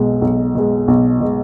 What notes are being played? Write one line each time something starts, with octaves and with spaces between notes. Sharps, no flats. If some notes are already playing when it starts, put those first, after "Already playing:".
Already playing: B1 B2 G#3
B1
B2 G#3
B1
B2 G#3